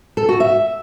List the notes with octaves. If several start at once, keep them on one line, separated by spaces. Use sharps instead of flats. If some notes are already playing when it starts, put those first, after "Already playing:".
A4
F#4
E5